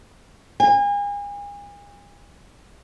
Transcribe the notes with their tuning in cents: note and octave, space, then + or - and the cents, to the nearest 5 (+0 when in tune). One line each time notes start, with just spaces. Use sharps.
G#5 -35